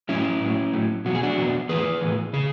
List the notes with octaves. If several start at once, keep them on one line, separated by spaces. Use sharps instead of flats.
A2 F#3 C#4 E4
A2 F#3
A2 F#3
E2 B2 F#3 F#4
G#4
D4 F#4
E2 B2 F#3
A2 E3 G#4 B4
A2 E3
C#3 G#4